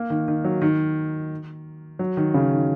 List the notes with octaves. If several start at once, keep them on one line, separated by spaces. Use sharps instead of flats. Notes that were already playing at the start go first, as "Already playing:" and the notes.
Already playing: A#3
D#3
D#3
F#3
D#3
F#3
D#3
C#3
D#3